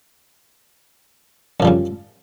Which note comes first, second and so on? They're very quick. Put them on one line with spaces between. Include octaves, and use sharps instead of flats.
F#2 F3 G3 C#3